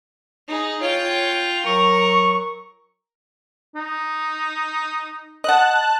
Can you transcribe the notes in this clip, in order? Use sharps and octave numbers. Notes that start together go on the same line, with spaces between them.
D#4 G#4
F4 C#5 G5
F#3 A#4 C#6
D#4
D#5 F#5 A5 F#6